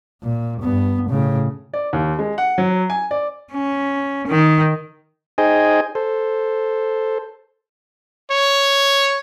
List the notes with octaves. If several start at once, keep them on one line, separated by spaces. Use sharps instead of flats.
A#2
G2 B3
A2 C#3
D5
D#2
G#3
F#5
F#3
G#5
D5
C#4
D#3
D#4 G#4 C5 D#5 G5 G#5
A4 C5
C#5